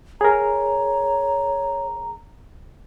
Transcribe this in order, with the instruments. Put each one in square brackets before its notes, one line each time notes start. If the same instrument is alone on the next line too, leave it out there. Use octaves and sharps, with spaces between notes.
[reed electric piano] G#4 A#4 [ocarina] C#5 [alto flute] A#5